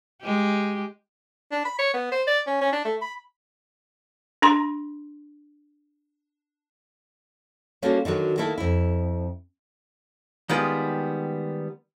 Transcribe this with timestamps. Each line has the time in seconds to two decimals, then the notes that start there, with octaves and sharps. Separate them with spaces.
0.22 G#3 G4
1.52 D4
1.65 B5
1.79 C#5
1.93 B3
2.12 C5
2.27 D5
2.47 C#4
2.61 C#4
2.72 D4
2.85 A3
3.01 B5
4.42 D4 A#5 C6
7.82 G3 A#3 C#4 F4 F#4 A4
8.05 D3 D#3 F#3 F#4
8.38 D#3 A3 A#3 E4 A4
8.58 F2 E4
10.49 D#3 G3 G#3 B3 F4